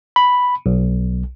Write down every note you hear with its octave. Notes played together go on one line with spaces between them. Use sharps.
B5
B1